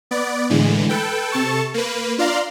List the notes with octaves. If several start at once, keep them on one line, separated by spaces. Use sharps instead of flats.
B3 D5
A2 D3 E3 G#3
A4 B4 G5
C3 A4 A5 C#6
A#3 B4
D4 F4 D5 F5 A#5 C6